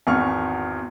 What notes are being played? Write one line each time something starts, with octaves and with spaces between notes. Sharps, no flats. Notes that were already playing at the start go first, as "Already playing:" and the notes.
G#1 E2 C#6 F6